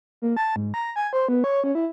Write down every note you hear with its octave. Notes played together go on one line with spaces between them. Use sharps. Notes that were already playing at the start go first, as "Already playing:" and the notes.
A#3
A5
G#2
A#5
G#5
C5
B3
C#5
C#4
E4